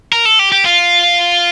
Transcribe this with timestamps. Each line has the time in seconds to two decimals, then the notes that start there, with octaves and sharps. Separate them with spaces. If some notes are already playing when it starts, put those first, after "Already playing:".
0.12 A#4
0.25 A4
0.39 G4
0.52 G4
0.65 F4